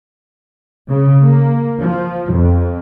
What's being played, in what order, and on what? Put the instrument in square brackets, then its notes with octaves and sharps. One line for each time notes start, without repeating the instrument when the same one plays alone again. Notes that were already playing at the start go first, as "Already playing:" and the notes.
[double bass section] C#3
A#3
F3
F2